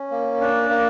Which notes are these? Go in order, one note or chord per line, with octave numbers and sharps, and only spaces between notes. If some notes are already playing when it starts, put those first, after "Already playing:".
Already playing: C#4
A#3
D4
A#3